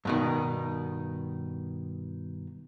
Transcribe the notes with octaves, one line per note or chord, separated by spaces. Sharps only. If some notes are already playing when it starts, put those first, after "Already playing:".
G2 B2 D#3